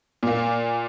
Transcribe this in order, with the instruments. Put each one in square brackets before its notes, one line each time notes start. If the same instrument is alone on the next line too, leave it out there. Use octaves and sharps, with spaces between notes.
[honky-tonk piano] A#2 A#3